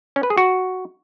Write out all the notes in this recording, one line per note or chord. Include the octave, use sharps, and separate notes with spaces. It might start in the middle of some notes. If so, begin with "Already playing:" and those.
C#4
B4
G#4
F#4